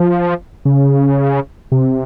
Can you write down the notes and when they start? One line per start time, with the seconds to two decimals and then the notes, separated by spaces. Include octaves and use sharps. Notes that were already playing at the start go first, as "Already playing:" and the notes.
Already playing: F3
0.65 C#3
1.72 C3